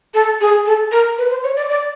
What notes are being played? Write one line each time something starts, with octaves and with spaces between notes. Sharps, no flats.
A4
G#4
A4
A#4
B4
C5
C#5
D5
D5